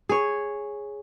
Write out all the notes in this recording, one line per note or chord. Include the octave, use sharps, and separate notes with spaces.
G#4 C#5